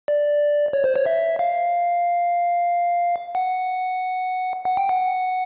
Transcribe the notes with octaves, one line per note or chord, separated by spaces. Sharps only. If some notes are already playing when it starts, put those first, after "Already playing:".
D5
C#5
C5
C#5
E5
F5
F#5
F#5
G5
F#5